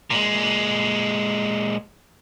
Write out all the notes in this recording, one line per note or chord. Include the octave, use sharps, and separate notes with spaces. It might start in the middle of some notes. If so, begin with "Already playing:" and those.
A#2 G#3